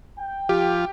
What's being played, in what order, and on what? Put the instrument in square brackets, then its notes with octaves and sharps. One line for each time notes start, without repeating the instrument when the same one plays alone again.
[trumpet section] G5
[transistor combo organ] F3 F4 [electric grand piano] G4